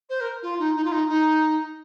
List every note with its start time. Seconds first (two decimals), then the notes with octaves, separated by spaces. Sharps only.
0.09 C5
0.20 A#4
0.42 F4
0.59 D#4
0.76 D#4
0.84 F4
0.92 D#4
1.08 D#4